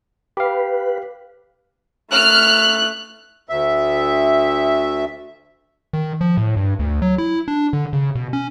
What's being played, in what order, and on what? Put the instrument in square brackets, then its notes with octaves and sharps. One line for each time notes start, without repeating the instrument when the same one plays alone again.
[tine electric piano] G4 F5 [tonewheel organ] B4
[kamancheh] A3 F#6 [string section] F6
[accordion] D2 E5
[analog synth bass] D#3
F3
A2
G2
D2
F#3
E4
D4
D3
C#3
B2
C#4